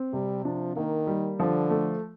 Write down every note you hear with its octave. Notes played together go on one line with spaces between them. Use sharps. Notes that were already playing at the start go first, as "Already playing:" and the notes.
Already playing: C4
C3 G3
F3 D4
D#3 A#3
G3
D3 F3
A3